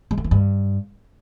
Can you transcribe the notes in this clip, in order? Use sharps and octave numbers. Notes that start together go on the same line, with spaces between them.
G#3
A3
E3
G2